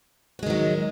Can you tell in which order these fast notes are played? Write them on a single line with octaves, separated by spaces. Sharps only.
F#4 G#3 D#3 F#3